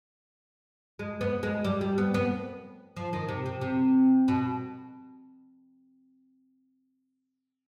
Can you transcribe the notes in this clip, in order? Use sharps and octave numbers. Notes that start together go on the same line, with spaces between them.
G#3
B3
G#3
G3
G3
B3
B3
F3
D#3
C3
C3
C3
B2